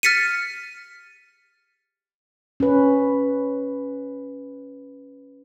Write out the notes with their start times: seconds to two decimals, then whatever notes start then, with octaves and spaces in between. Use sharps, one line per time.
0.03 F6 A6 B6 C#7 D#7
2.60 C#4 B4